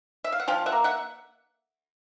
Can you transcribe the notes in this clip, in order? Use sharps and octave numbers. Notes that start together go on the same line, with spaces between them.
E5
F5
F#5
F3 F5 G5
E5 F#5
A#3
E5 F#5